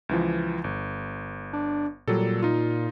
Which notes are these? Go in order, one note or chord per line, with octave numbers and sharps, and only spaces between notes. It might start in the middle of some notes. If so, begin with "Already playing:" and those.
C#2 E3 F3
G1
D4
A#2 F#3 G3 A4
D#4 F4